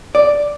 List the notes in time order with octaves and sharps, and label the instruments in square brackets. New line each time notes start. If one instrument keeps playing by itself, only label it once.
[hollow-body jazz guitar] D5